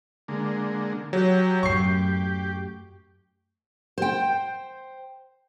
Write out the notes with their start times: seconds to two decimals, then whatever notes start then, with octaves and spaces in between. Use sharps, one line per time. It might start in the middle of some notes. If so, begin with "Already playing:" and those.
0.28 D3 G#3 A#3
1.13 F#3 G4
1.63 F#2 A2 C#6 C7
3.98 C5 G5